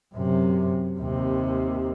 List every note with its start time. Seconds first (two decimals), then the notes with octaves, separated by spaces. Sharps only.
0.14 F#2 C3
0.99 D#2 C3